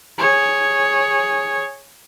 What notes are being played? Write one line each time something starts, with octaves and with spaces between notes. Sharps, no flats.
G#4 C#5